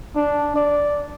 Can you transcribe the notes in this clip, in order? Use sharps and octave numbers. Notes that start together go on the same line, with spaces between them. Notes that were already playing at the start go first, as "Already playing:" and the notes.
D4
D5